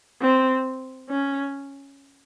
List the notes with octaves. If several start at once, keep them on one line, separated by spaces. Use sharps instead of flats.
C4
C#4